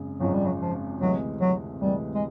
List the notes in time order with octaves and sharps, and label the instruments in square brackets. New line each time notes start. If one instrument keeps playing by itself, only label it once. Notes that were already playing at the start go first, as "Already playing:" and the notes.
Already playing: [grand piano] G#1 F#2 C#3 G#3
[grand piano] G#1 F#2 C#3 F3 G#3 [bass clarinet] F#3
[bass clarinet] G3
F#3
F3
[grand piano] D2 C3 E3 G#3 [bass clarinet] F#3
[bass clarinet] F#3
[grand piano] D2 C3 E3 G#3 [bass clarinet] G3
[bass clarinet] G#3